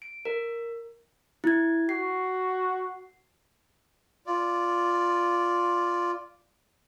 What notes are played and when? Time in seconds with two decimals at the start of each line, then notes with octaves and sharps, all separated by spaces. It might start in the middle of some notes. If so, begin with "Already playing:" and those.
0.02 D7
0.25 A#4
1.44 E4 G#6
1.89 F#4 C7
4.26 F4 D5